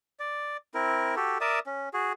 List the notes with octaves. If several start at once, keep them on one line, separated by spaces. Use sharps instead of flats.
D5
C4 E4 A#4
F#4 G4 A4
A#4 D5 E5 D#6
C#4
F#4 G#4